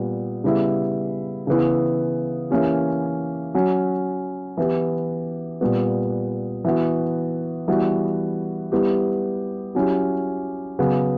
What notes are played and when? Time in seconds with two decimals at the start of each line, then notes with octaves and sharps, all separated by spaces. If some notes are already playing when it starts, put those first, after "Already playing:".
Already playing: A#2 G3 B3
0.44 C#3 G3 B3 E4
1.47 C#3 E3 B3 E4
2.50 E3 A#3 C#4 G4
3.54 F#3 C#4 F#4
4.57 E3 B3 E4 G4
5.61 A#2 G3 B3
6.65 E3 B3 F#4
7.68 E3 G3 B3 F#4
8.72 G3 B3 E4 G4
9.75 F#3 C#4 E4 G4
10.79 C#3 F#3 B3